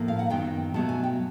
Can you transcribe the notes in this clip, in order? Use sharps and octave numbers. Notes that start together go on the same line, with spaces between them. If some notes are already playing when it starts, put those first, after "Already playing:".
Already playing: A2 F3 A#3
F5
F#5
F#2 D#3 F#3 B3 G5
B2 F#3 A3 A5
G#5
G5